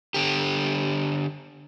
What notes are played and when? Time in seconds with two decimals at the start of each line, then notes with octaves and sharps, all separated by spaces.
0.14 D3 G4